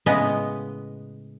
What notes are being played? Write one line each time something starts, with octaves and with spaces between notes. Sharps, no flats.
A2 C#3 G#3 B3 D#5